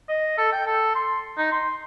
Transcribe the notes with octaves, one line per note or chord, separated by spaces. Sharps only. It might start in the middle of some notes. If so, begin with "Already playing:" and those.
D#5
A4
G5
A4
C6
D#4
C6